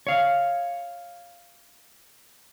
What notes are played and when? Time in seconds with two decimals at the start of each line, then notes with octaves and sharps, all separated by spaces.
0.07 C#5 F5